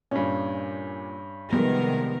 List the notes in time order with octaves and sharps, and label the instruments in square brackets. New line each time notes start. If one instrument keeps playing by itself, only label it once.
[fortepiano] G2 C#4 [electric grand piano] A#2 G#5
[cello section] C3 D#3 A#4 [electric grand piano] F3 G3 G#3 [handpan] B3